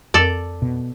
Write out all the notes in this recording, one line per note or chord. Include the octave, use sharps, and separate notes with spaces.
F2 A4 D5
B2